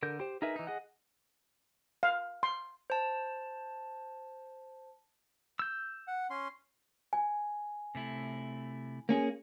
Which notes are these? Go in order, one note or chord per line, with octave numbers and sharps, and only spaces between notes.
D3 A#4 G6
G4 C5
D#4 G#4 A#4 B4 E5
E3 D#4
G#4 D#5 F#5
F5
C6
C5 A5
E6 G6
F#5
C#4 C6
G#5
C3 A3 E4
A#3 C#4 G#4